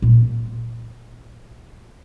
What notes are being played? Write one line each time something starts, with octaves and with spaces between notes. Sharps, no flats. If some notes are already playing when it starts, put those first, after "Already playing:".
A#2 F4